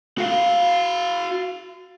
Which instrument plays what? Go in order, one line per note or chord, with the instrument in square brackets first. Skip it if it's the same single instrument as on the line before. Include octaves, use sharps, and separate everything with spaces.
[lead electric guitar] F#4 F5